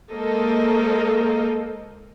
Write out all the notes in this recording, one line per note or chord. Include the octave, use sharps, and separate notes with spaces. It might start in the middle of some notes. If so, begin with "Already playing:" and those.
G#3 A#3 A4 A#4 C5 D#5